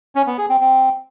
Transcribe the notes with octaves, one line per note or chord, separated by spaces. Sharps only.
C#4
B3
G#4
C4
C4